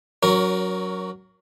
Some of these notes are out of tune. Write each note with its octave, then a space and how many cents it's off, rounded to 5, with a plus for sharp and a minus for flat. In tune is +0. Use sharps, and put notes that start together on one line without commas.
F#3 +0 C#4 +30 A#4 +10